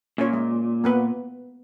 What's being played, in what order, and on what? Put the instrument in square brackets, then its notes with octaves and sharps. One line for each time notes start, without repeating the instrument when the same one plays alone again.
[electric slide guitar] A#2 [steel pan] C#4 F4 C#5
[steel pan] G#3
A#3 B3 B4